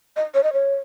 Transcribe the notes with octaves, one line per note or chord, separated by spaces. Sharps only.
D#5
C#5
D#5
C#5